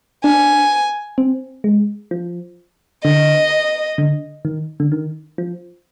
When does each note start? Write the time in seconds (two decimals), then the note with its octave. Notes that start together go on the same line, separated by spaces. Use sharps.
0.24 D4 G#5
1.18 C4
1.64 G#3
2.11 F3
3.04 D3 D#5
3.98 D3
4.45 D#3
4.80 D3
4.92 D#3
5.38 F3